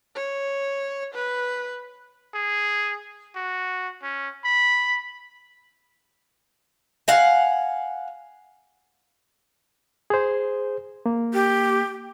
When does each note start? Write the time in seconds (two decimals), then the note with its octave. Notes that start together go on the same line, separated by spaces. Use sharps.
0.15 C#5
1.14 B4
2.34 G#4
3.36 F#4
4.03 C#4
4.44 B5
7.08 F5 F#5 G#5
10.10 G#4 C5
11.06 A#3
11.34 G4